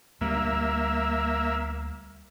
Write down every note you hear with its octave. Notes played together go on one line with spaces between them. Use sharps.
D2 G3 A#3 E5